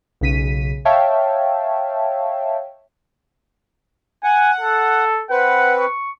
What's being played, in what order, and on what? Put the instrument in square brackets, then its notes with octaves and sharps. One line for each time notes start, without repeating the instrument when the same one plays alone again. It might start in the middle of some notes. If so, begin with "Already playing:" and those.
[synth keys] B1 C#3 B6 D#7
C#5 E5 F5 G5 A5
[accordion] F#5 [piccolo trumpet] G#5
[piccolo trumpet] A4
[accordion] C4 B4 [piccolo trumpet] F#5
[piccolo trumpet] C#6